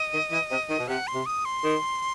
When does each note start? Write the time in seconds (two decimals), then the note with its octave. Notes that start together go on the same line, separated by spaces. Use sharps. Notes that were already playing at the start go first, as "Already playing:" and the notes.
Already playing: D#5
0.12 D#3
0.31 E3
0.50 C3
0.69 D#3
0.79 B2
0.88 C3 F#5
1.07 C6
1.13 C3
1.26 D#6
1.45 C6
1.63 D#3